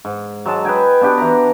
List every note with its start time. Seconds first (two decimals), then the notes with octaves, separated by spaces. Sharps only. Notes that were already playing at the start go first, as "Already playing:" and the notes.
0.05 G#2
0.46 F#3 G#3 A5
0.65 B4 D#5 G5 G#5
1.01 B3 D4 F#4 G4
1.18 E3 A#5